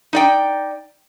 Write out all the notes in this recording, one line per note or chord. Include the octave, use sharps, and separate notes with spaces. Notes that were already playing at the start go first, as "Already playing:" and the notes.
D#4 D5 G5